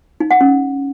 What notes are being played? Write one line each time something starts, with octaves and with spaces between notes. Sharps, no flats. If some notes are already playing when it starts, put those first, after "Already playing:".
D#4
F#5
C#4